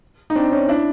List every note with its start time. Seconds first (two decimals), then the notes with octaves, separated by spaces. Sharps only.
0.30 D#4
0.35 C4 D4
0.52 C#4 D#4
0.69 D4 E4